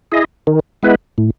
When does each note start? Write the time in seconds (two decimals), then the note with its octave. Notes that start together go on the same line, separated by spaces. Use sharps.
0.12 E4 G#4 D#5
0.47 D#3
0.83 G#3 B3 E4 B4
1.18 A2